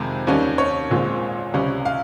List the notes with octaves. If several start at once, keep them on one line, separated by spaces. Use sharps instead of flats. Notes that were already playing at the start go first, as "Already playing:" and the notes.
Already playing: F2 C3 D#3 G#3
D#2 D#3 G3 C#4
C#5
A#1 A#2 G#3 C4
C#2 C3 G3 C#4
F5